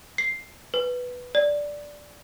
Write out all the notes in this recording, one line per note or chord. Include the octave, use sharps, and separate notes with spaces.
C7
B4
D5